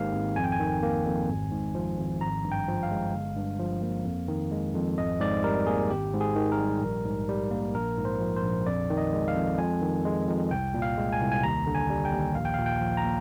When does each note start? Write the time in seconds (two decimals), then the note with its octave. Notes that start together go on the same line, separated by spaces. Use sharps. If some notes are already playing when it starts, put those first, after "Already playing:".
Already playing: G#1 G#2 D#3 A#3 G4 F5
0.13 G#1
0.36 F2 G#5
0.44 G5
0.52 G#5
0.60 D#3
0.83 A#3
1.06 F2
1.29 G#1
1.52 G#2
1.75 F3
1.98 G#1
2.21 G#1 A#5
2.44 G2
2.52 G5
2.68 F3
2.83 F5
2.91 G#3
3.14 G1
3.36 G2
3.59 F3
3.82 A#3
4.05 F2
4.28 D#3
4.51 G#3
4.75 F2
4.98 G#1 D#5
5.20 G#2 D5
5.44 G3 A#4
5.67 A#3 G#4
5.90 G#1 G4
6.14 G#2
6.21 G#4
6.35 D#3
6.52 A#4
6.59 G3
6.82 A#1
7.05 G#2
7.29 G3
7.51 A#3
7.75 A#1 A#4
7.98 G#2
8.05 C5
8.20 F3
8.36 C5
8.44 A#1
8.66 F2 D5
8.90 D#3
8.98 D#5
9.13 G#3
9.28 F5
9.36 F2
9.58 F2 G#5
9.81 D#3
10.05 G#3
10.27 F2
10.51 C2 G5
10.74 A#2
10.82 F5
10.97 G#3
11.12 G#5
11.21 C2
11.32 G#5
11.43 D#2 A#5
11.67 D3
11.75 G#5
11.90 G3
12.05 G5
12.13 D#2
12.35 A#1 F5
12.45 G5
12.54 F5
12.58 A#2
12.66 G5
12.81 F3
12.97 A#5
13.04 A#3